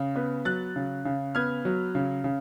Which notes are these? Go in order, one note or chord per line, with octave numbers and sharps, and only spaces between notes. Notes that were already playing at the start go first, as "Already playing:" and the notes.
Already playing: C#3
B3
F#3 F#6 A6
C#3
C#3
B3 F6 G#6
F#3
C#3
C#3